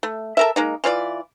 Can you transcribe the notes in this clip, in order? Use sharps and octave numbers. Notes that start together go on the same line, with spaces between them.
A3
A4 A#4 E5
G#3 A#3 D#4
E3 F4 C#5 D5